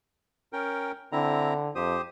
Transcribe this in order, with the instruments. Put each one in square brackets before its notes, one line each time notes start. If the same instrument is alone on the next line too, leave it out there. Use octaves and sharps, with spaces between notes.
[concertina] C#4 A#4 G5
[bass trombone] D3 [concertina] C4 E4 A#5
[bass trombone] F2 [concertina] G4 C5 D#6